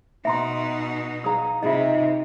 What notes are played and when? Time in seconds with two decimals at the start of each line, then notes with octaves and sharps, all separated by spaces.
0.25 B2 D#4 E5 A#5 C6
1.24 G#4 F5 A#5 D#6
1.62 C3 D#4 F4 G#4 D#5 E5